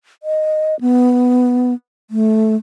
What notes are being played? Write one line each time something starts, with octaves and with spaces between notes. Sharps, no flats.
D#5
B3
A3